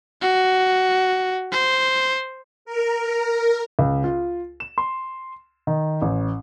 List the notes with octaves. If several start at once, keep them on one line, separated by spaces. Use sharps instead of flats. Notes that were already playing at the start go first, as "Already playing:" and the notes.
F#4
C5
A#4
C#2
F4
E7
C6
D#3
A1